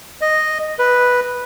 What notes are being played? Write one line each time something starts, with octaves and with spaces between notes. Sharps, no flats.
D#5
B4